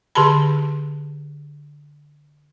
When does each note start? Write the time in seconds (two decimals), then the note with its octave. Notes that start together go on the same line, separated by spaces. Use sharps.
0.15 D3 G4 G#4 A5 B5